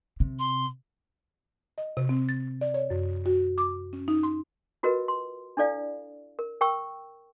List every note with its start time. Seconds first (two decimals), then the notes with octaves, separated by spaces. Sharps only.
0.20 C3
0.39 C6
1.78 D#5
1.97 C3
2.09 C4
2.29 A6
2.61 D5
2.74 C#5
2.90 F#2
3.26 F#4
3.58 D6
3.93 C#4
4.08 D#4
4.23 C6
4.83 F4 F#4 A#4 B4 D#5
5.08 C6
5.57 D4 E4 A4 D5 F5
6.39 A#4
6.61 A#4 G5 C#6 E6